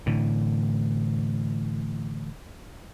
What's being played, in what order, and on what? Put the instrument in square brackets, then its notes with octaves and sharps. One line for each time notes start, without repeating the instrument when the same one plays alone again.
[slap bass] A2 D3 E3